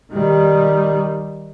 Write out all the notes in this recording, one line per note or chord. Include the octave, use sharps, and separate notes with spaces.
D#3 G3